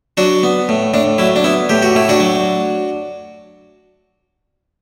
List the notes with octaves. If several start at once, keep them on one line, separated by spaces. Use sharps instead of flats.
F#3 D4 F#4
B3
A2
A2 D4
F#3 E4
D4
B3 E4
A2 G4
F#4
A2 E4
D4 F#4
F#3